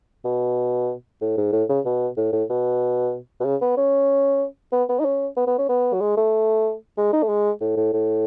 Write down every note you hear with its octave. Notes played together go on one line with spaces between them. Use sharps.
B2
A2
G#2
A2
C#3
B2
A2
A2
B2
B2
C#3
B3
C#4
B3
B3
D#4
C#4
B3
B3
C#4
B3
F#3
G#3
A3
G#3
D#4
A3
G#3
A2
A2
A2